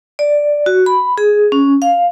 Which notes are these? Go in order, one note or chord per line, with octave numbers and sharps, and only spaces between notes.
D5
F#4
B5
G#4
C#4
F5